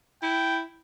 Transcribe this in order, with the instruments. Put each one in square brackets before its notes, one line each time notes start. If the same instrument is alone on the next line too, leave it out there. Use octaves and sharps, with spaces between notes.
[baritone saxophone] E4 [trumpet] G5